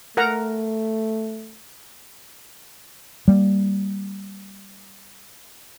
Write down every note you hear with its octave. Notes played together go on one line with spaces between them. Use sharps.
A3 A#4 F#5 A#5
G3 A#3